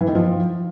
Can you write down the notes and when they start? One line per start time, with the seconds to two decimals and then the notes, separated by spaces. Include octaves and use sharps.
0.01 E3
0.08 D#3
0.15 F3